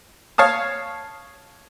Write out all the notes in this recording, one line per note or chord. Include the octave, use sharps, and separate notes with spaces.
C#5 F5 A5 D#6